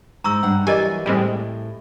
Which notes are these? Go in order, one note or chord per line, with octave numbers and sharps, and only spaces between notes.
G#2 A#5 C#6 E6
G2 G4 F#5
E3 F#3 G4 A#4 D5 D#5 G#5
A2 G3 G#3 C4